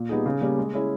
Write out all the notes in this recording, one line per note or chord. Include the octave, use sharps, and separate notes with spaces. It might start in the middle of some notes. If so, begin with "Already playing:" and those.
Already playing: A#2
G3 B3 D#4 G#4
C#3
G3 A#3 C#4
G#3
C#4 E4 G#4